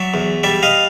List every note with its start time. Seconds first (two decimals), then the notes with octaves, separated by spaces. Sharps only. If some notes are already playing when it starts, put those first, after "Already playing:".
Already playing: F#3 D5 E5
0.14 E2
0.43 G3 D5 E5
0.63 D#5 F5